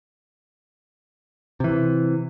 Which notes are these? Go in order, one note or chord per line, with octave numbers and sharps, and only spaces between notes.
C3 E3